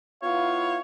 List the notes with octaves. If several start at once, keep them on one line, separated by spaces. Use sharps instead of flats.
B3 E4 F4 C#5 F5